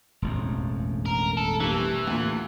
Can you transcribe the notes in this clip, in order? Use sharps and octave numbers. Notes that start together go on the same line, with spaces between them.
E1 A1 F2
A#4
A4
G2 E3 G3 A#3
D2 A#2